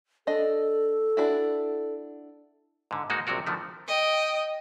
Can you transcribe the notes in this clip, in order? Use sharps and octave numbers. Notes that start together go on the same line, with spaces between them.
D4 A4 D#5
D4 E4 F#4
G#2 D3
G#2 G#3 A#3 D#4 F#4
A#1 C3 F#3 F#4 A#4
D3 D#3 F3 A3
D#5 G5